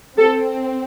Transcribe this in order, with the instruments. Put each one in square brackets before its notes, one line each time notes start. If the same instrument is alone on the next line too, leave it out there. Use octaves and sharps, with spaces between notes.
[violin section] C4 [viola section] A4